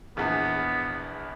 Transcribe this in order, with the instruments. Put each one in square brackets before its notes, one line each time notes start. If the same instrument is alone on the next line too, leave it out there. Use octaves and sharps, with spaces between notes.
[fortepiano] A#1 E2 [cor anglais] B3